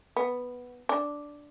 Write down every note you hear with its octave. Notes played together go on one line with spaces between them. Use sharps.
B3
D4